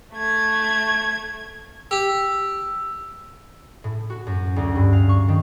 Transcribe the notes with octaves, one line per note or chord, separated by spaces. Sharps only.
A3 G#6
G4 E6
A2
F#4
F#2
D2
G2
F5
C#6
D#3